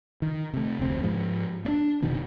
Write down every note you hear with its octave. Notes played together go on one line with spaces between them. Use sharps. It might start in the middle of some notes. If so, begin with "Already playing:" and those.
D#3
C3 A3
F1 D2 C4
G#2 F3 G#3
A#3 D4
F1 B2 D#3 B3